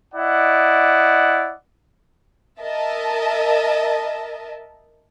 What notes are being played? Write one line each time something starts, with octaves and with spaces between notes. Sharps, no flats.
E4 D5 D#5 F#5
A#4 D#5 E5 A5